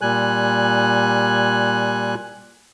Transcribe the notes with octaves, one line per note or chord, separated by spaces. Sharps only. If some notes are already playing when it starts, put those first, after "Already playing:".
A#2 G3 G#5 F#6